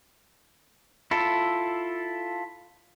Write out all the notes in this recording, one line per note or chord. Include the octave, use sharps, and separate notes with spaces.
E4 F4 A4